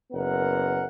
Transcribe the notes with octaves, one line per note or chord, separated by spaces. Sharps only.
F#1 B3 A#4 F#5